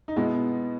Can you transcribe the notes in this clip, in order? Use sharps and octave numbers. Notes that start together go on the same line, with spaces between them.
D#4
B2 G#3 B3 E4